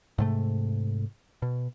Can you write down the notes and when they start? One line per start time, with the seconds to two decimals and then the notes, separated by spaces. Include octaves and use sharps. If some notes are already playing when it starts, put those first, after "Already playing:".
0.18 G#2 C3 A3
1.42 B2